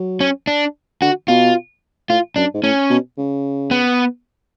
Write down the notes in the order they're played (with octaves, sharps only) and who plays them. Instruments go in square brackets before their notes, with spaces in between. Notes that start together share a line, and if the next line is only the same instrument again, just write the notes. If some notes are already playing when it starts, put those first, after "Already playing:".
Already playing: [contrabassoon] F#3
[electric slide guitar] C#4
D4
[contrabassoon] D3 [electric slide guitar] F#4
[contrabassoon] B2 [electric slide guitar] F4
[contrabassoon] A2 [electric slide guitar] F4
[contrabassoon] F#2 [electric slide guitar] D4
[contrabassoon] G#2
[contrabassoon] A2 [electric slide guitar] C#4
[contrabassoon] B2
C#3
[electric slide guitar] B3